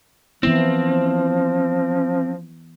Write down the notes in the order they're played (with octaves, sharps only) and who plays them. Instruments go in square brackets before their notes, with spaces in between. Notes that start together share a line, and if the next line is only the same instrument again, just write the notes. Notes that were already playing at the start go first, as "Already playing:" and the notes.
[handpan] E3 B3 E4 [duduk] F3 [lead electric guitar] C4